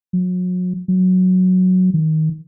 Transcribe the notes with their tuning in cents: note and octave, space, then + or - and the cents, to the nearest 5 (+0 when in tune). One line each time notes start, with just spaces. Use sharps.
F#3 -35
F#3 -5
D#3 +15